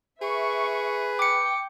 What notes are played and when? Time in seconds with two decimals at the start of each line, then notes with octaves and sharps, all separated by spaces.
0.22 G#4 B4 E5 C#6
1.19 G5 D6 C#7